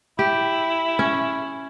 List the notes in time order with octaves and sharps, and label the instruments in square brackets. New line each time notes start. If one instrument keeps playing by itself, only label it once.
[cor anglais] E4 [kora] G4
[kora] C#4